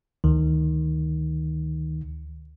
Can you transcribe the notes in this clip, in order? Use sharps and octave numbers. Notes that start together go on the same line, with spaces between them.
D2 D#3